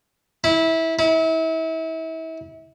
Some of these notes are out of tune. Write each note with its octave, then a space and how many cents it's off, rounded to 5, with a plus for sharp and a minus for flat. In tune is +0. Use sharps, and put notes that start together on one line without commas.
E4 -20
E4 -35